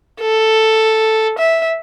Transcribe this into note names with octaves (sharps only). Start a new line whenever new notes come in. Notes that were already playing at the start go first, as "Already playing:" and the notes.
A4
E5